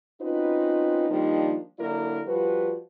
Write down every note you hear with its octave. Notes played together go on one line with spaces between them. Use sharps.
C4 C#4 D#4 F4 F#4 B4
D#3 F3 G3 A#3 D4 D#4
D3 F#3 A#3 E4 A#4 D5
F3 G3 F#4 B4